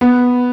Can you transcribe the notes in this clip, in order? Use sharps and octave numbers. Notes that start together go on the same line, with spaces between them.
B3